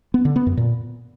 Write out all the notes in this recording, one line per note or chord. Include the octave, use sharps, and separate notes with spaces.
B3
D3
B3
F#2
A#2